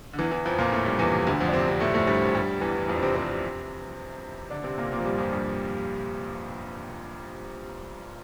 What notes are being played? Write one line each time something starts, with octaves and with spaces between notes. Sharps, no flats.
D3
E2 E3
E2 E3
F2 F3
A#2 A#3
A2 A3
G2 G3
E2 E3
C3
D2 D3
F2 F3
D4
C3 C4
C3 C4
A2 A3
A2 A3
G2 G3
G2 G3
E2 E3
E3
F2 F3
D4
C3 C4
C3 C4
C3 C4
D3 D4
C3 C4
A#2 A#3
A#2 A#3
F3
G2 G3
F2 F3
G2 G3